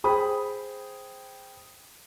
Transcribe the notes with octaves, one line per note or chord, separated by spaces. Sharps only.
G#4 C5 G5 B5 D#6